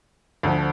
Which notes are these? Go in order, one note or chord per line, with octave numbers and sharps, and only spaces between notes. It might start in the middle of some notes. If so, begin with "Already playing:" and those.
D2 D3 F3